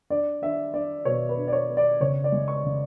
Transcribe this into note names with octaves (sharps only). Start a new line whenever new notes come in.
D4 D5
D4 E5
D4 D5
B2 C#5
B4
D4
D5
C#5
B3
D5
C#3 C#5
D5
G#3
C#6
C#3